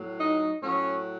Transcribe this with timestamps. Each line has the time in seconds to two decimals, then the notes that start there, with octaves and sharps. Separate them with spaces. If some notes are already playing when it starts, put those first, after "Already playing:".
Already playing: A2 F#3
0.20 D#4
0.62 A2 F#3 C#4